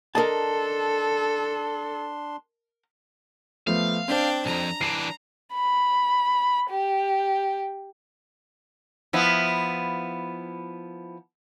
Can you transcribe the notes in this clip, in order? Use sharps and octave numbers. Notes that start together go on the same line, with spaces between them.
D4 A4 A#4 D#5 A5 C6
F3 A3 B3 F5
C4 D4 C5 G5
B1 F2 A#5
E3 D4 C7
B5
G4
F3 B3 E4